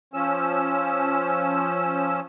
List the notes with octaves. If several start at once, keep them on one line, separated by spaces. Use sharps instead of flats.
F3 C#4 E6